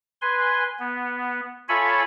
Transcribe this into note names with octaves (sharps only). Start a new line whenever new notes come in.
B4 G#5 C6
B3
F4 A4 C#5 E5 G#5 B5